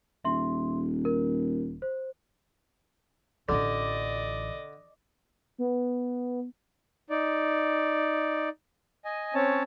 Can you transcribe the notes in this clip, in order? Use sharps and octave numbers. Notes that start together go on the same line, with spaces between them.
D#1 E5 C6
A#4
C5
A1 D3 F4 D5 D#5
B3
D#4 D5
D#5 G#5
C4 C#4 C#5 A5